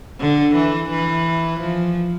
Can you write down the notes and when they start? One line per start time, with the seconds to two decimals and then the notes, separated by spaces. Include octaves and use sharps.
0.20 D3
0.55 E3
0.90 E3
1.60 F3